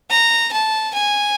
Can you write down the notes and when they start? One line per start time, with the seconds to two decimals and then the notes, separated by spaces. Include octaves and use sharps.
0.10 A#5
0.52 A5
0.94 G#5